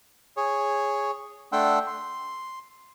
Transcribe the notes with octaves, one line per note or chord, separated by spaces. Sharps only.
G#4 C#5
A3 D4 F#5 G5 C6 E6
C6